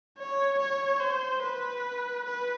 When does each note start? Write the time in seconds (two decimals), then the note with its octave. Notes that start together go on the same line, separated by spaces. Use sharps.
0.18 C#5
0.59 C#5
1.00 C5
1.43 B4
2.25 B4